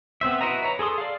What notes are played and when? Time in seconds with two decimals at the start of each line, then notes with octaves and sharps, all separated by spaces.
0.21 B3 C4 C5 E5
0.41 E4 F#4 B4 D#5 A#5
0.63 B4 C#5 A#5
0.79 G#4 A4 C6 D#6
0.98 D5 F5